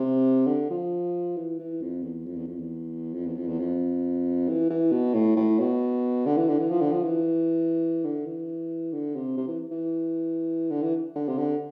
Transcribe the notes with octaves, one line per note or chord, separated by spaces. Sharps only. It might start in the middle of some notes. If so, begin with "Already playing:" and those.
Already playing: C3
D3
F3
E3
E3
F2
E2
F2
E2
F2
E2
F2
E2
F2
E2
F2
E3
E3
B2
A2
A2
B2
D3
E3
D3
E3
F3
D3
F3
E3
D3
E3
D3
C3
C3
E3
E3
D3
E3
D3
C3
D3